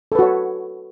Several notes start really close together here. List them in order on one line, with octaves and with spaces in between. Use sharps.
A4 B4 F#4 C#5